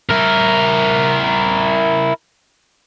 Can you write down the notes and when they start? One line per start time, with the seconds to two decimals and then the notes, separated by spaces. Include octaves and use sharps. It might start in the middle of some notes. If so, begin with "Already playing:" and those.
0.11 E4 A#4